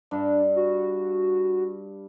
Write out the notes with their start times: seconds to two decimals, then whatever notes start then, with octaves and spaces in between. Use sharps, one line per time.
0.11 G2 D4
0.56 F#4